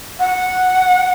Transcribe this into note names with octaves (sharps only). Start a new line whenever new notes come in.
F#5